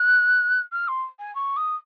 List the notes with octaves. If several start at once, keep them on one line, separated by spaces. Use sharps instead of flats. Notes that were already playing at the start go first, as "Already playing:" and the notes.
Already playing: F#6
F6
C6
G#5
C#6
D#6